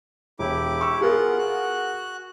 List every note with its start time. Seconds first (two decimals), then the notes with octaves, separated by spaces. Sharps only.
0.39 E1 E4 G4 D6
0.81 C#6 E6
1.01 B3 F4 G#4 A#4 F#5
1.38 F#4 F#6